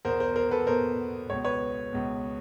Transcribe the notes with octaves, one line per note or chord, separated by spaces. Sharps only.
E2 B2 A#4 C5
A#4 C5
A#4 C5
A4 B4
E2 B2 A#4 C5
C#2 B2 C#5
B4 C#5
C#2 B2